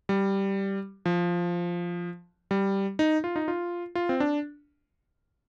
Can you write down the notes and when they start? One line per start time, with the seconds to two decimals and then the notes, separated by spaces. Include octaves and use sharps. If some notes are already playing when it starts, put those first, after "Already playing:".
0.09 G3
1.06 F3
2.51 G3
2.99 D#4
3.24 F4
3.36 D#4
3.48 F4
3.95 F4
4.09 C4
4.20 D4